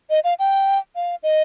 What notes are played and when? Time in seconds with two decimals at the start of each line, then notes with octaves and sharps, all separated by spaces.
0.10 D#5
0.24 F5
0.39 G5
0.96 F5
1.23 D#5